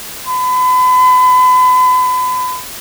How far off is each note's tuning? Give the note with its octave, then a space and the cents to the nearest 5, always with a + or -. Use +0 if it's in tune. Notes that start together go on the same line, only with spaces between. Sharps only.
B5 +35